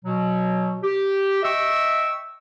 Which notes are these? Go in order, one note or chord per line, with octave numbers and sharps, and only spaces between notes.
B2 F#3
G4
D#5 E5 G5 C#6 E6